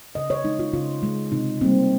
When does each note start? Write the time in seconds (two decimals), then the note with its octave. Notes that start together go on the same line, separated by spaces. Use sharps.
0.15 C#3 D#5
0.30 C#5
0.45 G#3 D#4
0.59 F4
0.74 C#3 F4
1.03 G#3
1.32 C3 D#4
1.61 G3 A#3 C4